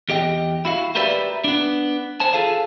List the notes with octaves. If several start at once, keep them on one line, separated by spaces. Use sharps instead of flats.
E2 G4 D#5 G5
E4 F#4 F5
F#4 G4 A#4 B4 D5 E5
B3 D4
C5 G#5 A5
F4 G#4 A4 F5 A5